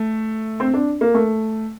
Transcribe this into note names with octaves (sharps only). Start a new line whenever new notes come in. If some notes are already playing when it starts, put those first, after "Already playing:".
Already playing: A3
C4
D4
A#3
A3